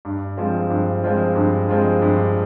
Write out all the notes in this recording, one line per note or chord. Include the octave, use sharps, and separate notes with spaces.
G2
F3 G#3 C4 F4
G2
F3 G#3 C4 F4
G2
F3 G#3 C4 F4
G2